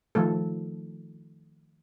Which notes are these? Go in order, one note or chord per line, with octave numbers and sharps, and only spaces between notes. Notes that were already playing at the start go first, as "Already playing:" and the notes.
D#3 F3 A3 A4